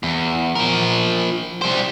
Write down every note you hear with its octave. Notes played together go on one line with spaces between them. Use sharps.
E2
F3 A#4
G3 C5